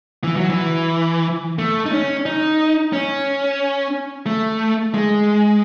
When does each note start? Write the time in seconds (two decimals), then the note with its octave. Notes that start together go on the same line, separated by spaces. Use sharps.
0.24 E3
0.36 F#3
0.50 E3
1.59 A3
1.86 D#4
1.92 C#4
2.25 D#4
2.93 C#4
4.26 A3
4.94 G#3